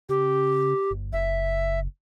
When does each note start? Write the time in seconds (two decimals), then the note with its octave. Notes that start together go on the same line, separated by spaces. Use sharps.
0.09 C#3 G4
0.91 G1
1.13 F#1 E5